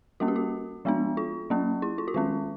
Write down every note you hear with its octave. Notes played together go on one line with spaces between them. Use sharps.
G3 A#3 C#4 F#4
G4
F#4
F3 G#3 B3 D4
F4
F#3 A#3 C#4
E4
F4
F#4
D#3 G#3 C#4 F4